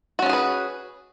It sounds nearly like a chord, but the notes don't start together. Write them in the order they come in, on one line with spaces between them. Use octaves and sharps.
F#4 C#4 B3 G#4 B4